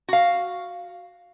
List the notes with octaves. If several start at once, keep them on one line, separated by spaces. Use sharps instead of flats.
F#4 F5